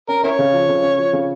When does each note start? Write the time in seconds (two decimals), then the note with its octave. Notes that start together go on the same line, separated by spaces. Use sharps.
0.08 C#4 A#4
0.23 C#4 E4 A#4 C#5
0.39 C#3
0.53 F3
0.69 C#3
0.83 C#4
0.98 F3
1.13 C#3